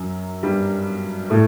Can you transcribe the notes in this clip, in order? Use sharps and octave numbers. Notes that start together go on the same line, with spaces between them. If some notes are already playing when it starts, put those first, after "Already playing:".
Already playing: F#2 F#3
G2 G3
A2 A3